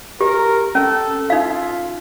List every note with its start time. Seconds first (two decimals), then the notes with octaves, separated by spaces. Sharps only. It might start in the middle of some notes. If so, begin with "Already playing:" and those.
0.21 G4 A#4
0.75 C#4 A4
1.30 D#4 F4 F5